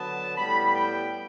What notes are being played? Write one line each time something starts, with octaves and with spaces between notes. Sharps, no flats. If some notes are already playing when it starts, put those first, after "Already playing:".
Already playing: D3 F#3 B3 A5
A2 G3 B3 B5
G5